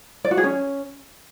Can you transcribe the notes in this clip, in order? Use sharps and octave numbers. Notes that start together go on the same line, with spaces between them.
D5
F#4
G#4
C#4